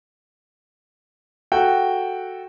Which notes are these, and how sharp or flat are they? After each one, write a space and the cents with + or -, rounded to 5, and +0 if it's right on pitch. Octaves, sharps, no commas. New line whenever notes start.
F#4 +0 A4 +0 G5 +0